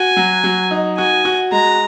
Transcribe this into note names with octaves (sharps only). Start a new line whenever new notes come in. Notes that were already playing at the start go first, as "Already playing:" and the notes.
Already playing: F#4 G#5
F#3
F#3
D#4
F#4 G#5
F#4
G#3 A#5